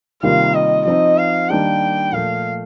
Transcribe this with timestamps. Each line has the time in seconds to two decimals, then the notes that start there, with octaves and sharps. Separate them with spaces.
0.23 C3 D#3 G3 A#3 F4 F5
0.55 D#5
0.85 F3 C4 D#4 D#5
1.17 F5
1.49 D#3 G3 A#3 D4 G4 G5
2.12 A#2 F3 A3 F5